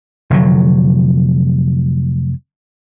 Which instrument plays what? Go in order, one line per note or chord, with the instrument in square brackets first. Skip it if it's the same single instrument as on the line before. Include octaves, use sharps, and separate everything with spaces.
[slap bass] F1 D3 F#3